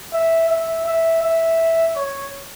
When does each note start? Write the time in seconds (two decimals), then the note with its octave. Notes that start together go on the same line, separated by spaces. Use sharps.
0.13 E5
0.50 E5
0.86 E5
1.23 E5
1.96 C#5